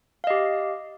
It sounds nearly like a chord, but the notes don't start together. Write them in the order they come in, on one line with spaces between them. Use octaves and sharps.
F5 D#5 G4